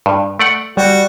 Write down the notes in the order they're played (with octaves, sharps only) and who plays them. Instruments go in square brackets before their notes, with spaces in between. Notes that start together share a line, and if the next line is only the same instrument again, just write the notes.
[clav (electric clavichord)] G2
A3 D5 F#5
[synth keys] G3 [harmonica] F#4